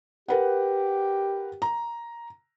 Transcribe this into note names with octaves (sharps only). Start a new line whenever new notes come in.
G4 A#4 B4 F#5
A#5